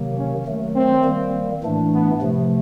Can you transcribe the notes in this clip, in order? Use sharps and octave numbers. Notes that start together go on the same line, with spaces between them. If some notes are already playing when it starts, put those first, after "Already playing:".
Already playing: C3 D#3 F#3 A#3
C#4
D#3 F#3 A3
C4
D#3 G3 A#3
A2 E3 A3 D4
B3
C3 F3 A3